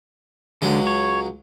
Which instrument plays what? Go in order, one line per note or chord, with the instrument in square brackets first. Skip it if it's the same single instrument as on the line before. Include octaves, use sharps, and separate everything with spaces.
[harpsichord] C#2 F#3 G#3 [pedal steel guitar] D3
[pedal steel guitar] C#5